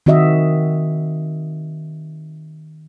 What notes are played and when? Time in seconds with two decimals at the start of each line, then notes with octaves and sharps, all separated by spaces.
0.06 D#3 C4 F#4 D#5 E5